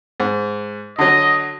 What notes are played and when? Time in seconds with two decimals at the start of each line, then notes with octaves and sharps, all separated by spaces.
0.20 G#2
0.99 D3 F#3 D#5